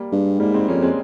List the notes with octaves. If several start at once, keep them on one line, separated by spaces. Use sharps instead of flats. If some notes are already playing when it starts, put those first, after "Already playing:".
Already playing: G3 A#3
G2 G#3
G#2 G3 A#3
G#3 C4
F2 A#3 C#4
G#3 C4